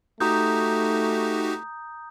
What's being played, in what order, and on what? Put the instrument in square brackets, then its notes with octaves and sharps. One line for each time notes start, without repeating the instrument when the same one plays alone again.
[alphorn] A3 [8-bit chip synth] D#4 F#4 G4 [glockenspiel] A#5 D#6 G6